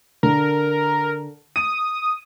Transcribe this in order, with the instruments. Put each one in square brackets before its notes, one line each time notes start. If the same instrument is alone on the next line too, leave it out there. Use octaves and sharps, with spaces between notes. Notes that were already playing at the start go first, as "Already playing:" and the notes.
[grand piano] D3 [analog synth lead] A#4
[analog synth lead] D#6 [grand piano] D#7